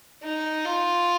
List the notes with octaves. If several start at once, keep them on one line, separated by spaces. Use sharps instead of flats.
D#4
F4